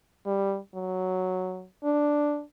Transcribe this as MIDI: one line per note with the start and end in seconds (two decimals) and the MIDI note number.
0.26 0.58 55
0.75 1.65 54
1.84 2.42 62